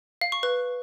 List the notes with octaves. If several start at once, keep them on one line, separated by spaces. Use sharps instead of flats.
F5
C#6
B4